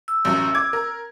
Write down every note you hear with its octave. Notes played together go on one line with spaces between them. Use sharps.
E6
A1 F#2
D6 G#6
A#4